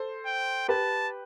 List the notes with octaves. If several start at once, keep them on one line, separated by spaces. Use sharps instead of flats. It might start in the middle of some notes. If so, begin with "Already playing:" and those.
Already playing: A4 C5
G5
G4 B4 A5